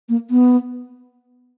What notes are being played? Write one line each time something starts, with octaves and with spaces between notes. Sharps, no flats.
A#3
B3